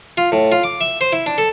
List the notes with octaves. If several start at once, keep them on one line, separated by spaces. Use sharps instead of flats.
F4
A2
F4
D6
E5
C5
E4
D4
A4